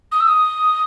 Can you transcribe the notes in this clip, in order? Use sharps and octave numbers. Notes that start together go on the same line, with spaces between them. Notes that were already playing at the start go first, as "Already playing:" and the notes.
D#6
E6
D#6